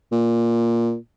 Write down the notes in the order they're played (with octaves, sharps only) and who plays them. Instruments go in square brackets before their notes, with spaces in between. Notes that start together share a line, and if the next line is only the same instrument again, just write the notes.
[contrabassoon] A#2